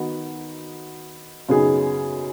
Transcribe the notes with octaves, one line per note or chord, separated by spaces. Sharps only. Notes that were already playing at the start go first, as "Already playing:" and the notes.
Already playing: D#3 B3 D#4 F#4
F#2 C#3 B3 D#4 G#4